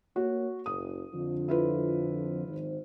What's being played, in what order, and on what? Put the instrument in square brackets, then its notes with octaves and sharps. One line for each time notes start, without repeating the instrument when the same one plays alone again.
[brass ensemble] A#3 C#5 [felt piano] F#4
[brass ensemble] F#1 [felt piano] D#6
[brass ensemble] F2 D3 F3
[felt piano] E4 F4 B4
[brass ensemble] G#1 D#3 C5